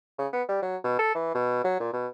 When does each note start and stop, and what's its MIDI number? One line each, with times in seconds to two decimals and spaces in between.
0.18 0.27 49
0.33 0.42 59
0.48 0.59 55
0.62 0.77 54
0.84 0.98 47
0.99 1.14 69
1.15 1.31 52
1.34 1.63 47
1.64 1.79 54
1.80 1.93 46
1.93 2.07 47